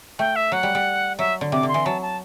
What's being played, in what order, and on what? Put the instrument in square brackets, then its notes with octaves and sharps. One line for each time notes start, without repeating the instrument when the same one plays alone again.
[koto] A3 [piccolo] G5
[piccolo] E5
[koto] F#3 [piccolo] F#5
[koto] G3
G3
[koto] F#3 [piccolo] E5
[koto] D3
[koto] C3 [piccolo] D6
[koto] D3
[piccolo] C6
[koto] E3
[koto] F#3 [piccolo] A5
[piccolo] A5